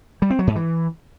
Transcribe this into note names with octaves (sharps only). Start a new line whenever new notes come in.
G3
C4
F#3
G#2
E3